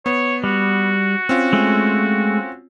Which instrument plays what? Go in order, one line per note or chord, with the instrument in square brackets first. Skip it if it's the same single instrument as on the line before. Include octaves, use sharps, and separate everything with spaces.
[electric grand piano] B3 [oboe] C#5
[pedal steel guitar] G3 [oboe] F#4
[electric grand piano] C4 C#4 F4
[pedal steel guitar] G#3 A3